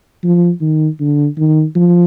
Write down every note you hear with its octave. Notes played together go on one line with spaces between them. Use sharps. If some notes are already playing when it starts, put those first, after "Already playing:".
F3
D#3
D3
D#3
F3